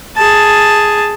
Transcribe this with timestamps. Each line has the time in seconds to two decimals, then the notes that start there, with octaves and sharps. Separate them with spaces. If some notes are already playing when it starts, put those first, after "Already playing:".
0.16 G#4 A5